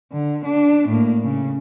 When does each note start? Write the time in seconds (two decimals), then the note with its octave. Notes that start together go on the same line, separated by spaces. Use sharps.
0.12 D3
0.45 D4
0.88 A2 A#3
1.23 C#3